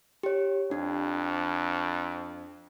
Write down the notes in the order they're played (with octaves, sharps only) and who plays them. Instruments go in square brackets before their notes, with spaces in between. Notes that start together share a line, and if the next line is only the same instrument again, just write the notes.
[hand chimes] G4 C#5
[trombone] F2 [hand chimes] D4